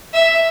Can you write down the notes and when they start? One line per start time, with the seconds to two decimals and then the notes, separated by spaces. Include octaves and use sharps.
0.13 E5